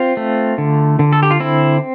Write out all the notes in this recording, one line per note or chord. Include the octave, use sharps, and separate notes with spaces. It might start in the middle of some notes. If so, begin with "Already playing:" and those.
Already playing: C4 F4
A3
D3
D3
A4
G4
F4
C4 E4